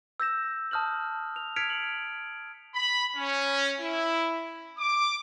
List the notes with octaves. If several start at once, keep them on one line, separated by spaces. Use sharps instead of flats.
E6 G6 A#6 E7
A5 D#6 F6 G6 F#7
F7
F6 G#6 B6 C#7 D7 F7
F#7
B5
C#4
E4
D6